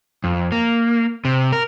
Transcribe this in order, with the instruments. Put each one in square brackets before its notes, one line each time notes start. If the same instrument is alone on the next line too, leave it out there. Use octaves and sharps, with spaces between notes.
[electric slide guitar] F2
A#3
C3
A#4